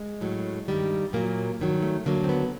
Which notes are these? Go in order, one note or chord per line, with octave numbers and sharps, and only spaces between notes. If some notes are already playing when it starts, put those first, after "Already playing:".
Already playing: G#3
A2 F#3
G2 D#3 G3
A#2 F#3 A#3
G2 D#3 F#3
A3
D#2 D3 F#3 A#3
C4
B3